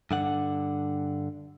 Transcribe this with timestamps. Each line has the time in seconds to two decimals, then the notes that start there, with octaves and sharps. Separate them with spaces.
0.11 G2 D3 F#5